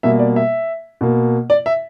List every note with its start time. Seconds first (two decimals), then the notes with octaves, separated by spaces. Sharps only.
0.03 B2 G3 A#3 E5
0.19 D5
0.36 E5
1.01 B2 A#3
1.50 D5
1.66 E5